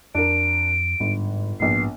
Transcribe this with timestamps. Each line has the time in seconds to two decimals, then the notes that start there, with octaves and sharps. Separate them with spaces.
0.15 F2 D4 A#4 D7
1.00 G1 G#2
1.60 A#1 G#2 B3 C7